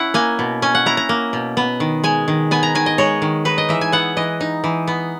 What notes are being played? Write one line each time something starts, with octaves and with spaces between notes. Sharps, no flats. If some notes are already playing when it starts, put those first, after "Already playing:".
Already playing: C#4 E4 F#5
A#3 G#5
B2
C#4 G#5
F#5
E4 A#5
A#5
A#3
B2
B3
D#3
G#3 G#5
D#3
B3 G#5
A#5
D#3 G#5
D#5
G#3 C#5
D#3
D#4 B4
D#5
E3 E5
G#5
B3 F#5
E3 D#5
D#4
E3
B3